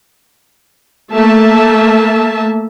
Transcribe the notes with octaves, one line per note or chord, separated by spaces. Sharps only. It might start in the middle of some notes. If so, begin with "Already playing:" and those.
A3 A#3 E5 A5